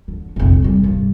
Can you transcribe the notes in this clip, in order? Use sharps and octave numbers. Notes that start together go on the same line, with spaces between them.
D3
F1 A#1
C3 G3
G2